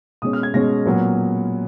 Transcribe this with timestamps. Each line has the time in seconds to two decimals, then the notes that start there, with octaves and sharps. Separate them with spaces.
0.22 B2 G#3 C#4 D#6
0.33 F6
0.43 G#6
0.54 B2 G#3 C#4 A#6
0.85 A#2 F#3 B3